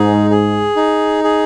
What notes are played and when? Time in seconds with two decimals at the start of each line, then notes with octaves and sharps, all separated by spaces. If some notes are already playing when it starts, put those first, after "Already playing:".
Already playing: G#2 D#4 G#4
0.31 G#4
0.76 D#4
1.24 G#4